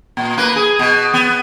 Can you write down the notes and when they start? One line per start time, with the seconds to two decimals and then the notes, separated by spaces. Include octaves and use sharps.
0.17 A#2
0.37 A#3 B4
0.56 G#4
0.79 B2
1.14 B3